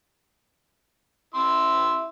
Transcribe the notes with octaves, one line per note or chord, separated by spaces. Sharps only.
E4 C6 E6